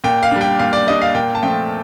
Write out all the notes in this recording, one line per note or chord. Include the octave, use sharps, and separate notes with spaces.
A#2 G5
F5
G3 D4
G5
A#2 F5
D5
G3 D4 D#5
F5
A#2 G5
A5
F3 A3 C4 G5